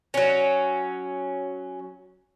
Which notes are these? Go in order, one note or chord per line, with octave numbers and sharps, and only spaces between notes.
F#3 C#4